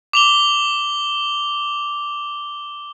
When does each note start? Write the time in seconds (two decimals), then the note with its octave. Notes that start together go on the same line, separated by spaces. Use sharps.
0.13 D6 F7 G7